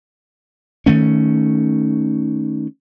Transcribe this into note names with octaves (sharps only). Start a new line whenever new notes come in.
D#3 A3 C#4